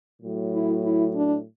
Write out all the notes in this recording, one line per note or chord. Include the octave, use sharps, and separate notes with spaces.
A2 F#3
E4
E4
D4